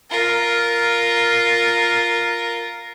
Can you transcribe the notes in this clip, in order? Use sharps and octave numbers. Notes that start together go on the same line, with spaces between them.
F4 A#4